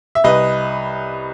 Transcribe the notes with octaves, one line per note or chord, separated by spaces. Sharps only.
E5
C2 B4 D#5